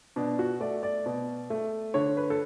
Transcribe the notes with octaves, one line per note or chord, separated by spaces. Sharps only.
B2 D4
F#4
A3 D5
D5
B2
A3
D3 C#5
B4
A4